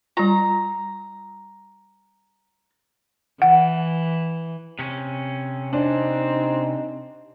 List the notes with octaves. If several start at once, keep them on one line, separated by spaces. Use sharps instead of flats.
G3 F4 A#5
E3 F#5
C3 C#4
C4 D4 D#4